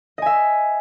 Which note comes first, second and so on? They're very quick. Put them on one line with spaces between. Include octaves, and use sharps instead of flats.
D#5 G#5 E5